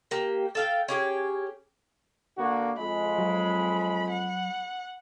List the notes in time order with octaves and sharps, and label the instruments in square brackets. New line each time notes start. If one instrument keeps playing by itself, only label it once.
[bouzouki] A#3 G4
A4 F5 G5
C#4 G4 G#4
[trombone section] D3 A#3 F#4
[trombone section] F2 G#3 [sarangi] B5
[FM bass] F#3
[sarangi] F#5